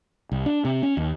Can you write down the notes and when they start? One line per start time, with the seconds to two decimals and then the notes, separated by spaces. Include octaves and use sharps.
0.32 C2
0.46 D4
0.65 C3
0.83 C#4
0.97 D#2